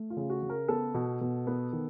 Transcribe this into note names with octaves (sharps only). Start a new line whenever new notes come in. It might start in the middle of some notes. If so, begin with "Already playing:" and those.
Already playing: A3
F4
C#3
F#4
C#3
A#4
B3 A4
B2
B2
B3
D#3